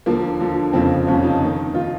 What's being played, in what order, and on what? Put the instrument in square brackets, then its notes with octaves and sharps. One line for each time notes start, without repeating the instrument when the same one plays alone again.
[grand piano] D#2 D3 F3 A#3
D#2 D3 F3
F1 F2 C#3 F3 C4
F1 F2 C#3 F3 C#4
D#4
D#2 D#3
D#3 F4